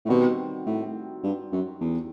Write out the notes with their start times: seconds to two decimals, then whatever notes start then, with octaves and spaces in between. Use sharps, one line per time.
0.05 A2
0.09 B2 D#3 G3 C4 F#4
0.66 A2
1.23 G2
1.52 F#2
1.81 E2